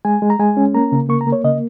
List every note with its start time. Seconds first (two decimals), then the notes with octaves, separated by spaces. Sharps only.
0.05 G#3 G#5
0.22 G#3
0.30 A#5
0.39 G#3 G#5
0.57 C#4
0.74 A#3 A#5
0.92 C#3
1.09 A#3 C#6
1.21 A#5
1.27 A#3
1.32 C#5
1.44 C#3 D#5